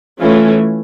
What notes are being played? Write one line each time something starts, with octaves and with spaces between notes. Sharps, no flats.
E3 A3 C#4 F4